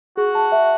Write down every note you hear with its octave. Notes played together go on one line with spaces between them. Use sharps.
F#4 G#4
A5
E5